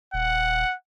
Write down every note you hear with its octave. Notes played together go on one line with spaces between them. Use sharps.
D#1 F#5